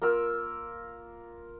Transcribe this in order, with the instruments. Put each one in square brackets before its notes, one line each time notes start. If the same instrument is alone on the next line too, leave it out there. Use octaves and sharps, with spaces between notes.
[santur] A#3 F4 A#4 E6